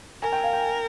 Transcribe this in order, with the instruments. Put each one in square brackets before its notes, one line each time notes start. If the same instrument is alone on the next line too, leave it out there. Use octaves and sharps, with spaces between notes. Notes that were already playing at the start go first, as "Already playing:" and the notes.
[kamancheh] A#4 [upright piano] G#5
[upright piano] G5
F5
G5